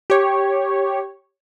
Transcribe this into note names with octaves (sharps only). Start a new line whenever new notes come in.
G4 C#5